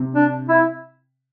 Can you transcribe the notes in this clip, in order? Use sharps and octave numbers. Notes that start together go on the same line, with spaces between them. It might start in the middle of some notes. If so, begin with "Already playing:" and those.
Already playing: C3
D4
E4